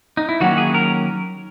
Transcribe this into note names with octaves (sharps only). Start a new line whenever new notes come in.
D#4
E4
D#3 F#3 A#3 C#4 F#4
G#4
A#4